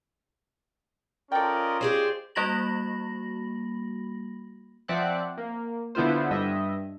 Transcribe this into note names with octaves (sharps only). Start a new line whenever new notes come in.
C#4 F4 A4 A#4 D5 D#5 G5
G4 G#4 C5 D5
G3 A#3 F#4 B5 A#6 F#7
F3 C4 D5 E5 F#5 F#6
A#3
D3 B3 E4 F4 C5
G2 D#5 E5